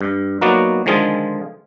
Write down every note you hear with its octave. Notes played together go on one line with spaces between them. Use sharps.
G2
F#3 A#3 B3 D#4 F#4 D5
D3 D#3 F3 G#3 F4 G#4